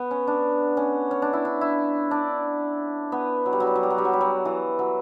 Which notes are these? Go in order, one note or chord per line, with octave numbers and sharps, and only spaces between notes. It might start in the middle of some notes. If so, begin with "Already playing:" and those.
Already playing: B3
C#4
D4
C#4
C#4
D4
E4
D4
E4
D4
B3
F#3
G3
F#3
G3
F#3
G3
F#3
G3
F#3
G3
F#3
E3
F#3